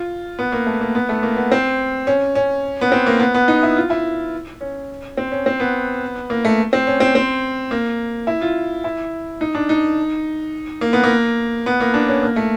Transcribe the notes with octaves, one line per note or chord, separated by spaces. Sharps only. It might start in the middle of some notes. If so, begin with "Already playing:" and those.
Already playing: F4
B3
A#3
A3
A#3
B3
A3
A#3
B3
C4
C#4
C#4
B3
C4
A#3
B3
B3
D#4
E4
F4
E4
C#4
C4
C#4
C4
B3
A#3
A3
C4
C#4
C4
C4
A#3
E4
F4
E4
D#4
D4
D#4
A#3
B3
A#3
B3
A#3
D4
C#4
A#3
A3